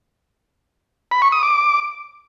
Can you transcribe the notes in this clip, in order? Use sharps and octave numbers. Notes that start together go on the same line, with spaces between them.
B5
C#6
D#6
D6